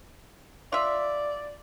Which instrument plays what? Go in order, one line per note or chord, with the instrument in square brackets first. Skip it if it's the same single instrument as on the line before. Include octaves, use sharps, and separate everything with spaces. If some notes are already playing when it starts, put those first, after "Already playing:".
[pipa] F4 E5 [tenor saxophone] D5